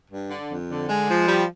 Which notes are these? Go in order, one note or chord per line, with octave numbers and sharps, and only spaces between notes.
G2
D3
F2
D3
G#3
F3
G3